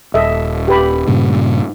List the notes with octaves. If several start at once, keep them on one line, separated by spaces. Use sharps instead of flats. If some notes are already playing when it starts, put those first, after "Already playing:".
D#1 A4 D#5 E5
G4 B4 B5
G2 A#2 C#3